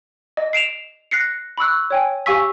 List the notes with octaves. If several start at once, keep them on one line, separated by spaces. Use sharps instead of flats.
D#5
C7 D7 E7 F7
F#6 A#6 C7 C#7
B5 C#6 E6 F#6
C#5 G5 G#5
G4 F5 G#5 C#6 E6 B6